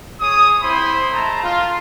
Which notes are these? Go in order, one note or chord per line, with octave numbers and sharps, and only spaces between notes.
G#4 C#5 D#6
C4 E4 C5 B5 C6
G#3 A3 A5 A#5
F4